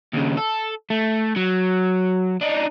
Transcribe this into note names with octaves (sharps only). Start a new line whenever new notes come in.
D#2 C#3
A4
A3
F#3
D4 D#4